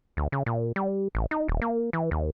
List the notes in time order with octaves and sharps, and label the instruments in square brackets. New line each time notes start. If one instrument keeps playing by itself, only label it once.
[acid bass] D2
C#3
A#2
G3
A1
D#4
D#1
A#3
E3
D#2